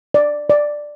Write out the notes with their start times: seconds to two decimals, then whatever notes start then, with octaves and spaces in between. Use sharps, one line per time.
0.14 D5
0.50 D5